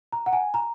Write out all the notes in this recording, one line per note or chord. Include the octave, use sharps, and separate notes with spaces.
A#5
F#5
G#5
A#5